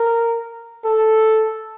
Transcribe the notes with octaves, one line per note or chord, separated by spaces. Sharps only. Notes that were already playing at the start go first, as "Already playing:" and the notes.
Already playing: A#4
A4